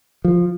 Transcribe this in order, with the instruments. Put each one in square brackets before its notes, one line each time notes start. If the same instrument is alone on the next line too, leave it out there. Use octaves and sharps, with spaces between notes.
[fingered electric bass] F3